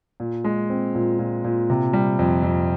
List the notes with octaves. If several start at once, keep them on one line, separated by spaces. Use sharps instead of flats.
A#2
G#3
C4
A#2
A#2
A#2
C3
G3
F2
F2